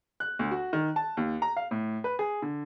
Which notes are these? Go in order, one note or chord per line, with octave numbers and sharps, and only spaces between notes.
F#6
D2
F#4
D#3
A5
D#2
A#5
F5
A2
B4
G#4
D3